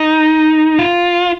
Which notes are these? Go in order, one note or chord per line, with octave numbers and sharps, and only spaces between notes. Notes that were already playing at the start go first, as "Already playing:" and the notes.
Already playing: D#4
F4